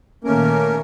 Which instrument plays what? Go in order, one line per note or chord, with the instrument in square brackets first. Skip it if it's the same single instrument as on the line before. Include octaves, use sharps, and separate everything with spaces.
[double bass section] A#2 D#3 A#3 [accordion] A3 C#4 A#4